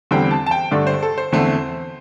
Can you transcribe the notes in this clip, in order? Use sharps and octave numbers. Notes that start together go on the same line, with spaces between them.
E2 D3 G3 C4 G5
A5
A5
G5
G2 D3 A3 D5
C5
A4
C5
E2 D3 A3 C4